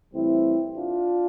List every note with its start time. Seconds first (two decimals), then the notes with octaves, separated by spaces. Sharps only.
0.13 A2 E3 G3 C4 E4
0.76 D4 F4